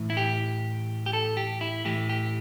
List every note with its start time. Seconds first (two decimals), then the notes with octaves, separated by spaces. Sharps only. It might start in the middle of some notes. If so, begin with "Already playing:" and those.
Already playing: A2 E3
0.10 E4
0.17 G4
1.06 G4
1.13 A4
1.37 G4
1.61 E4
1.85 A2 E3 G4
2.09 G4